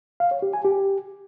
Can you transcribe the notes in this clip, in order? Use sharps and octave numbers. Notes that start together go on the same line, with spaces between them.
F5
C#5
G4
G#5
G4